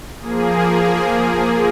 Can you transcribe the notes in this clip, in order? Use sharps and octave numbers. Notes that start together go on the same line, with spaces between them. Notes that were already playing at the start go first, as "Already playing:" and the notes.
F3 A#3 G#4